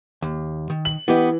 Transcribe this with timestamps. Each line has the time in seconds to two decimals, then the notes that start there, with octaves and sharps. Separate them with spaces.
0.22 D#2
0.70 D#3
0.85 F#7
1.08 E3 B3 G4 D#5